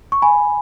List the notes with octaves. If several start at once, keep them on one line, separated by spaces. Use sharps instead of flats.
C#6
G#5 B5